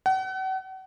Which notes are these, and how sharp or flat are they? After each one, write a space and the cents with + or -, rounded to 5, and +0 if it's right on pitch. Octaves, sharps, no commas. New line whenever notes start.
F#5 +40